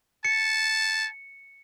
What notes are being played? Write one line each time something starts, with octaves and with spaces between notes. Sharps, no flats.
A5 C#7